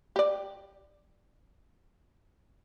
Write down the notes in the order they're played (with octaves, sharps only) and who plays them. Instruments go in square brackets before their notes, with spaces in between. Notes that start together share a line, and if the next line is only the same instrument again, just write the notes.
[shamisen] G4 D5